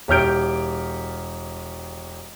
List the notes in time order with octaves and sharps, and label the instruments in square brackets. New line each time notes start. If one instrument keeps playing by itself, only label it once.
[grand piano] E1 G4 C#5 F6 G6 D7